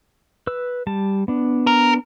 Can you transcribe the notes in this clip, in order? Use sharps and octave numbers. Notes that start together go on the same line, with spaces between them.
B4 E6
G3 A5
B3 D4
A#4